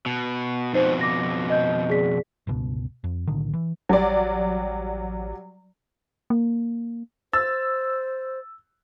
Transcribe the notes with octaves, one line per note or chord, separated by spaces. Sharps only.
B2
F2 B2 D#4 C5
D6 A#6
D#5 G6
G#4 D5 B6
G1 C#2 B2
F2
B1 A2 D3 D#3
E3
A1 F#3 G3 D5
A#3
C5 E6 A6